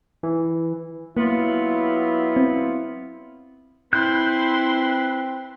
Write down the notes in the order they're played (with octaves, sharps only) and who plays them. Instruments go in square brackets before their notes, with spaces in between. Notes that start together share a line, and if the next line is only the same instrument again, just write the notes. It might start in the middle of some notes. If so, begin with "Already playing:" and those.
[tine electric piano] E3
[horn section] F#3 B3 F4 [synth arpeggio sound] A#3 [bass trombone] E4
[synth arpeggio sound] C4
[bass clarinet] C4 [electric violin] E4 C6 [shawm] B4 [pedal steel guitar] F#6 G6